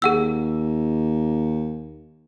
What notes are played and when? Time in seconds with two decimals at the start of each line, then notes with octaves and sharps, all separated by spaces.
0.02 D#2 G#4 F#5 E6